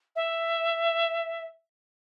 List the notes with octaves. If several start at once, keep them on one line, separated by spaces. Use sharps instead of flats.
E5